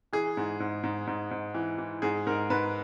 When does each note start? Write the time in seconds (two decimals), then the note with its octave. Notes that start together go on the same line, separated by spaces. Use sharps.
0.13 E3 G#4
0.37 G#2
0.60 G#2
0.84 G#2
1.07 G#2
1.31 G#2
1.54 E3
1.78 E3
2.02 G#2 G#4
2.27 G#2 A#4
2.50 G#2 B4